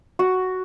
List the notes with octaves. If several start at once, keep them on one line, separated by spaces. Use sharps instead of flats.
F#4